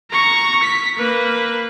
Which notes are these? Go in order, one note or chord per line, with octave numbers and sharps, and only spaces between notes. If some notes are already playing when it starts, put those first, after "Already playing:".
A#5 C#6
B6
A#3 B4